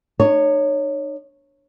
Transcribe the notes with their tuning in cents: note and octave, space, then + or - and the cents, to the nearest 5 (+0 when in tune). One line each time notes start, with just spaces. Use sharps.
D#4 -40 C#5 +0